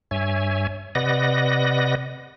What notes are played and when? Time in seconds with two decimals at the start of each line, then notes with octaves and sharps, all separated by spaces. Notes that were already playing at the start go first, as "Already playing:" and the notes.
0.11 G2 C#5 E5 G#5
0.95 C3 B4 D5 D#5 F#5 A#6